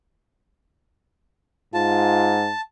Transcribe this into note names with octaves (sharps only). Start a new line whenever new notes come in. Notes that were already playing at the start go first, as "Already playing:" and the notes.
G#2 F4 A5